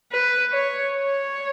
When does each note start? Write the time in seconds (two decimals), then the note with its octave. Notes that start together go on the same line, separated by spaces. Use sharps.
0.12 B4
0.52 C#5
0.93 C#5